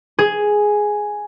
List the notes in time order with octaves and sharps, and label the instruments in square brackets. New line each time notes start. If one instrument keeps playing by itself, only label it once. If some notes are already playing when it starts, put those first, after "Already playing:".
[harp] G#4